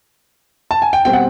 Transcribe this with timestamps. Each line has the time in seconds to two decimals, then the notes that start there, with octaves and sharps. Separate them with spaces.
0.71 A5
0.82 G#5
0.93 G5
1.05 B2 G3 C4 G5
1.13 F#5